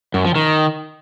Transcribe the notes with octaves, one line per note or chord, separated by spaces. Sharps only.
F#2
F3
D#3